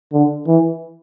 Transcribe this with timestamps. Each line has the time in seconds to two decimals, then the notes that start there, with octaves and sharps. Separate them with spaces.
0.13 D3
0.47 E3